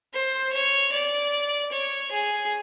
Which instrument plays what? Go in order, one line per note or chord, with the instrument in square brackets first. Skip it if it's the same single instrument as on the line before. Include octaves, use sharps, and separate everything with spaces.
[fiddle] C5
C#5
D5
C#5
G#4